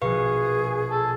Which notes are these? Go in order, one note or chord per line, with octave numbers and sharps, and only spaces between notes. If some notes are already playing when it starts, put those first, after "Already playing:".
A#1 B2 G#4 B4 F5 C#6
A4